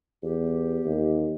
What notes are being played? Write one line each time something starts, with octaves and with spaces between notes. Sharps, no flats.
E2 G4
D#2